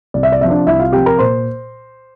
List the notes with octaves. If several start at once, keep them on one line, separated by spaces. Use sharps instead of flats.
C2 D5
E5
D5
C3 F3 E5
D4 D5
C2 E4 E5
F4 F5
C3 F3 G4 G5
A#4 A#5
A#2 C5 C6